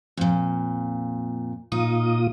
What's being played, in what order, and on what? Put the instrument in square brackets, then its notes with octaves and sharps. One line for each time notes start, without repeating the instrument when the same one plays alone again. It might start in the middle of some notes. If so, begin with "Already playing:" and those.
[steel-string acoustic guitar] F2 A#2
[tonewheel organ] A#2 F4 D#6 [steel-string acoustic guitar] D#4